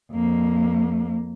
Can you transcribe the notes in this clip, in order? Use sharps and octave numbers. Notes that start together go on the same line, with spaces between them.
F2 A#3